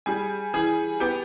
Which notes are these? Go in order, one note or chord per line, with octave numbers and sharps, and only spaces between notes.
G3 G#4 G#5
E3 G#4 G#5
B3 G4 G5